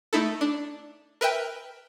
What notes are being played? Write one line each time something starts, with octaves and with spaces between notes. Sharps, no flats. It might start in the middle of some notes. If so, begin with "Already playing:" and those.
A3 D#4 E4 A4
D4
A#4 B4 E5 G5